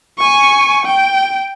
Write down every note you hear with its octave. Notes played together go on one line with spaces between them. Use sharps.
G#5 C#6
G5